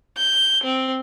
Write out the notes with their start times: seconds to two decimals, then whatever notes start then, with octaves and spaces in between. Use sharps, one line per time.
0.17 G6
0.64 C4